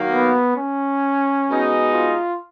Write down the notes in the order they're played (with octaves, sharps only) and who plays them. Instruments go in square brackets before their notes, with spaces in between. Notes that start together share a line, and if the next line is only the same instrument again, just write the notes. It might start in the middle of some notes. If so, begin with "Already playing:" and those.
Already playing: [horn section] D#3 F#3 A#3
[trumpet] B3
C#4
[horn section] B2 G#3 D#4
[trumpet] F4